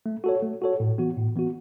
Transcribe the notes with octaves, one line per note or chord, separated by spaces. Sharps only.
A3
F#4 A4 C#5
A3
F#4 A4 C#5
A2
E3 B3 F#4
A2
E3 B3 F#4